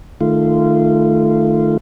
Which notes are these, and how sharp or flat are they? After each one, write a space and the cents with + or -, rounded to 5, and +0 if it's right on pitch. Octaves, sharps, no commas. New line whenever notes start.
D#3 -30 A3 -10 F4 -20